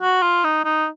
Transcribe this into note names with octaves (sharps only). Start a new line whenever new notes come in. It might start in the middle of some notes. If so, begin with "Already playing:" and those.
F#4
F4
D#4
D#4